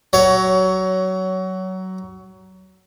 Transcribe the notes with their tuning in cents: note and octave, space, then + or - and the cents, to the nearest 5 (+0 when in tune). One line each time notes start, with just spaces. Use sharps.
F#3 +20 C#5 +15